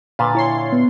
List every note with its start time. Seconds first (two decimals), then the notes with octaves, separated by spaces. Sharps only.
0.19 A#2 D3 B4 F5 A6
0.35 E4 C#5 C6
0.72 B3